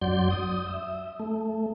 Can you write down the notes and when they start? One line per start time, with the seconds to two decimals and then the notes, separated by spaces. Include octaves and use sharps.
0.02 F#2 F#3 D5 C6 G6
0.31 D#6
0.67 E5
1.20 A3